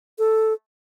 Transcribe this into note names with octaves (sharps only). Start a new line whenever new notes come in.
A4